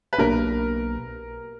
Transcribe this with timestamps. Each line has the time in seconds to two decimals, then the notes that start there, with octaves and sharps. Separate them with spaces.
0.13 B4
0.18 B1 B2 A#3 D4 A#4